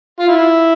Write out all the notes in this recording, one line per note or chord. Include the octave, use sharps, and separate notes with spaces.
F4
E4